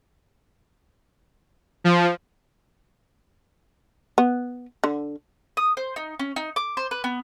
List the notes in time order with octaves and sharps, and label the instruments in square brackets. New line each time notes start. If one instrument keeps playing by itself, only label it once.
[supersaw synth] F3
[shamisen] B3
D3
[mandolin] D#6
C5
D#4
C#4
D#4
D6
C5
B4
B3